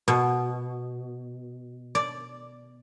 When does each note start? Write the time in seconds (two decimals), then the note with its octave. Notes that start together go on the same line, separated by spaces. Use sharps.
0.08 B2
1.95 D5